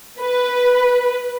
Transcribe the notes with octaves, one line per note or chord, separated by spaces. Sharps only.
B4